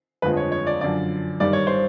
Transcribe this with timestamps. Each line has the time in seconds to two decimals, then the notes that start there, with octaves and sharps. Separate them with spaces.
0.22 G1 F2 D3 F3 G#3 B4
0.37 C#5
0.52 C#5
0.67 D5
0.81 F#2 D3 F3 D5
1.40 G#1 G2 D#3 G3 D5
1.53 C#5
1.67 C5